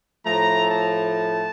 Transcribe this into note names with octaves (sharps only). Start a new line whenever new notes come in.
A2 F3 A3 A#5
A5